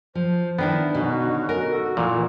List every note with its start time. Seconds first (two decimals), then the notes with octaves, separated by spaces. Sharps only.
0.15 F3 C5
0.58 D#3 B3 D4 E4
0.95 B2 D3 C#4 D#4 F#4
1.49 A#4
1.71 F#4 A4
1.97 A#2 E3